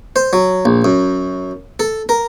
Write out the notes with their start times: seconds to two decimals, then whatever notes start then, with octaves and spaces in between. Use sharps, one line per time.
0.16 C5
0.33 F#3
0.65 A#1
0.84 F#2
1.80 A4
2.09 A#4